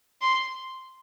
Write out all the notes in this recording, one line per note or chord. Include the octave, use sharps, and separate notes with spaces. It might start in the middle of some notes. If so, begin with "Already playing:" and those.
C6